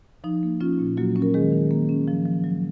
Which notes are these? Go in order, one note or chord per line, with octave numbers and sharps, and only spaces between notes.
F3 D#4
A#3
F3 C#4 F4
A#2
F#3 A#3 F#4
C#4
A#4
D#3 G#3 G#4
D#3
A#3
C#4
F3
F3
F#3